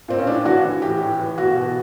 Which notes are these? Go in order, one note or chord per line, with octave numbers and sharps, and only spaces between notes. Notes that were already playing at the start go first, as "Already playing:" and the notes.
A#2 C4
C#4
A2 D4
E3 F#4
E3
A2 G4
A2
E3
B2 F#4
B2